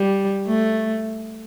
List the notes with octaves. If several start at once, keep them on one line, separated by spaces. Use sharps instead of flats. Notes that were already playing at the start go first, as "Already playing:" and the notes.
Already playing: G3
A3